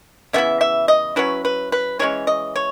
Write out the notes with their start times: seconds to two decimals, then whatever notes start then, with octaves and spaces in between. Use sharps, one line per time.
0.33 C#3 E3 B3 E4 E5
0.61 E5
0.88 D#5
1.16 F#3 C#4 E4 B4
1.45 B4
1.72 B4
1.99 E3 G#3 C#4 C#5
2.27 D#5
2.56 C#5